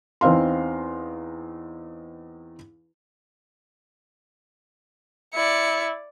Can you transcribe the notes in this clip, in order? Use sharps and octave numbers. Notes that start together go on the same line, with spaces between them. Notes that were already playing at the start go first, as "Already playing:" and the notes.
E2 C4 D#4 F5 C6
E4 D5 C#7